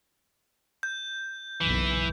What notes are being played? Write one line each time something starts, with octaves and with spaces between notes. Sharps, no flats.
G6
F#1 B1 E3